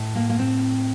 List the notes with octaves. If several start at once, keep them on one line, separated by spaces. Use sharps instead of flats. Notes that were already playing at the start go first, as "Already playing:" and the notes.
Already playing: A2
A#3
A#3
C4